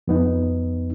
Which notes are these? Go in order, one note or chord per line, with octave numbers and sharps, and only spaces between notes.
F2 B3 D#4